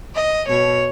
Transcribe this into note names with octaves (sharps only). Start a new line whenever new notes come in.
D#5
B2 C#5